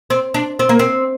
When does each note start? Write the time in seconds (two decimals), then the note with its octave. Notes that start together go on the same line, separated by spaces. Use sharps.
0.10 C4
0.34 D4
0.59 C4
0.69 A#3
0.79 C4